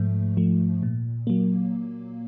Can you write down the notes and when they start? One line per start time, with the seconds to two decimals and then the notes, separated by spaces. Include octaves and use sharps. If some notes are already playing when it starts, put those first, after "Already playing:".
Already playing: G#2 F3 A3
0.37 F3 A3
0.83 A#2
1.27 F#3 A#3